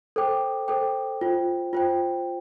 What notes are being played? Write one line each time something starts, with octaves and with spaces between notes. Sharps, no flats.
A4 C5 G5 D6
A4 C5 G5 D6
F4 C5 G5
F4 C5 G5